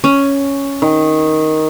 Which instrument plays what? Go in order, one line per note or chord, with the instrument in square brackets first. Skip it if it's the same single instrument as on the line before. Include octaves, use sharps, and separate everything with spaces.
[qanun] C#4
[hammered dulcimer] D#3